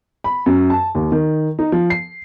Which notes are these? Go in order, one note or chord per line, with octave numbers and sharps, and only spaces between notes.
B5
F#2
A5
D#2
D#3
D#4
F3
C7